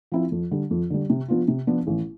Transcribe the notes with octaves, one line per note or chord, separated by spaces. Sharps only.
F3 C4 E4
F2
D3 G3
F2
D3 G3
C3
F3 B3 D4 F4
C3
F3 B3 D4 F4
A1